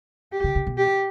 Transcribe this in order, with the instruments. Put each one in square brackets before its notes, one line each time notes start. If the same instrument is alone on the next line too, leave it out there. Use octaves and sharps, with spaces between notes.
[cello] G4
[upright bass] C#3
C3
B2
[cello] G4